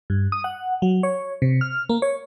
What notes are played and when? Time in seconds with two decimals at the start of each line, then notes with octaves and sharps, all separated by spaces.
0.10 G2
0.32 D#6
0.44 F#5
0.82 F#3
1.03 C#5
1.42 C3
1.61 F6
1.89 A#3
2.02 C#5